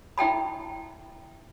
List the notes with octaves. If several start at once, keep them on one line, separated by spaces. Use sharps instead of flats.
E4 E5 G5 A5 B5